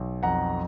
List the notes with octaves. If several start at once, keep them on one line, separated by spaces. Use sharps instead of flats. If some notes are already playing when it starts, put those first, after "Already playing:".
Already playing: B1
F2 F#5 A#5